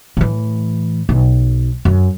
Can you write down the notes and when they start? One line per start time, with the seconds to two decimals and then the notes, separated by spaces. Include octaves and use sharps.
0.17 A2 E3
1.09 B1
1.85 F#2